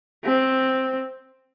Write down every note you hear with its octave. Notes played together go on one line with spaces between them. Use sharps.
C4